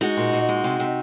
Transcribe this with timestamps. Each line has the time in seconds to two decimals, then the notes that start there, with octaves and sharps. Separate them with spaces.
0.01 G#3 D#4 F#4
0.17 A#2
0.33 A#2
0.49 G#3
0.64 C3
0.80 C3